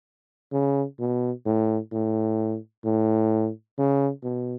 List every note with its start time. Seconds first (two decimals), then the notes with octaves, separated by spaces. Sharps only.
0.52 C#3
0.99 B2
1.46 A2
1.92 A2
2.84 A2
3.78 C#3
4.23 B2